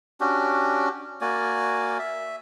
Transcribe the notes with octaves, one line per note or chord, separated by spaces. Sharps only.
C#4 D4 F#4 G4
A#3 F#4 D5 G#5
E5